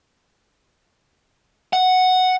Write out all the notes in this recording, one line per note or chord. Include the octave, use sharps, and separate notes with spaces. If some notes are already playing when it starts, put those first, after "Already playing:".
F#5